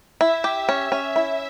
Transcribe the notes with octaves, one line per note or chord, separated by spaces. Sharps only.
E4 E5
G4
C#4
C#4
E4